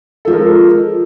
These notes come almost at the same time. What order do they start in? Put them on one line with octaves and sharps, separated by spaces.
A4 F3 G#3 A#4